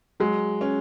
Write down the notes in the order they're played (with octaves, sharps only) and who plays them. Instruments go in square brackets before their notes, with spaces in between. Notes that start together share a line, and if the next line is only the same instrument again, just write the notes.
[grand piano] F#3 [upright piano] G#3
[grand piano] C#4